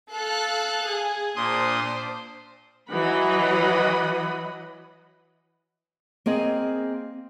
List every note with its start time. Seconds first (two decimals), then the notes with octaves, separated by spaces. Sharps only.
0.12 A4 F5 F#6
0.86 G#4
1.36 A#2 D4 C5 C6 D#6
2.91 E3 F#3 D#5 F#5 B5
6.26 A#3 C4 G#4 D#5